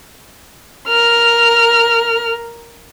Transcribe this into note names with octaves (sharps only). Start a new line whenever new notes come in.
A#4 F6